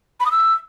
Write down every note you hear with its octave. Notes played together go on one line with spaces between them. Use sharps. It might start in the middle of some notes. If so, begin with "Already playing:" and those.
B5
D#6
E6